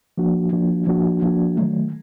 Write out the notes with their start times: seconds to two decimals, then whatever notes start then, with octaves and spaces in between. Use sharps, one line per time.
0.18 F3 A#3 D4 F#4
0.52 F3 A#3 D4 F#4
0.87 F3 A#3 D4 F#4
1.22 F3 A#3 D4 F#4
1.56 D#3 F#3 A3